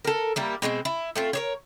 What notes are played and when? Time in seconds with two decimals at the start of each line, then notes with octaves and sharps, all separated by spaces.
0.05 A4 A#4
0.36 G3 A#3 E4
0.62 B2 G#3 A3 C4
0.85 E4
1.16 A3 C4 F4
1.33 A#4 C5 C#5